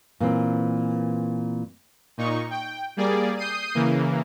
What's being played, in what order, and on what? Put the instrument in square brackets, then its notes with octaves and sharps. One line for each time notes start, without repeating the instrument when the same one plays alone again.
[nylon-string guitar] A#2 E3 C4
[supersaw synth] A#2 D#4 C#6
G5
G3 A#3 G#4 D5
D#6 G6 C7 D#7
C#3 E3 A#3